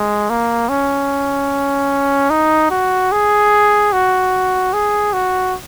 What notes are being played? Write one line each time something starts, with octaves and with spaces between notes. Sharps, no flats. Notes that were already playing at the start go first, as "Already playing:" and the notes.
Already playing: G#3
A#3
C#4
D#4
F#4
G#4
F#4
G#4
F#4